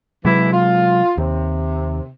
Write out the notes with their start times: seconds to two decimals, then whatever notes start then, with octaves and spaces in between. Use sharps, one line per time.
0.25 C3 E3 F#3 G#3 E4
0.52 F4
1.18 D#2 C3